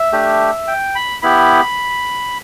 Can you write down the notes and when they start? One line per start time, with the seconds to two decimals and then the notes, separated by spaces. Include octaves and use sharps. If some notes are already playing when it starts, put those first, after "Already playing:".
Already playing: E5
0.12 A3 D4 G4
0.68 G5
0.95 B5
1.22 B3 E4 G4 B5